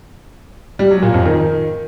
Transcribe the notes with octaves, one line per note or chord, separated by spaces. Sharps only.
G3
F#3
A#2
F2
D#3